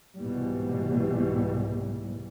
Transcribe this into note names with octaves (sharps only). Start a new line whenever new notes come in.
C2 G#2 B2 E3 G3